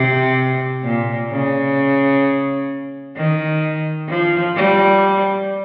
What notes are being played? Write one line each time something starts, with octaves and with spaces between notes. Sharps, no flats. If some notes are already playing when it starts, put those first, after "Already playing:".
Already playing: C3
A#2
C#3
D#3
F3
G3